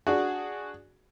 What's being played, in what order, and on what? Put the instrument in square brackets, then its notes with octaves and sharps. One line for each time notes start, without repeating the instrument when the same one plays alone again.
[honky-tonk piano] D4 G#4 [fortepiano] F#4